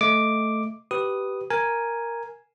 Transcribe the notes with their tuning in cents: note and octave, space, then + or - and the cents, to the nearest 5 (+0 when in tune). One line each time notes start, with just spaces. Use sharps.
A3 +0 D#5 +0 D6 +0
G4 -15 B4 +0 D#6 +0
A#4 +0 G#5 +0